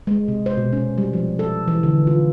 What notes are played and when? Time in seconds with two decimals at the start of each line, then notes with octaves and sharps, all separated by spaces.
0.07 G#3
0.28 C3
0.46 C5
0.57 B2
0.73 C#4
0.98 G3
1.13 F3
1.39 A4
1.68 E3
1.83 D3
2.07 F4